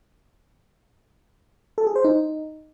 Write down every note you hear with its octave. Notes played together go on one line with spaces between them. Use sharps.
A4
G#4
C5
D#4